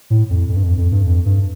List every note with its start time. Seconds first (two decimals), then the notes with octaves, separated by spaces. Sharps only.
0.10 A2
0.30 F2
0.49 F2
0.56 G2
0.63 F2
0.77 F2
0.92 G2
1.06 F2
1.26 G2